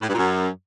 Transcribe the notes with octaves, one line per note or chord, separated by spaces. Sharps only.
A2
G2
A#2
F#2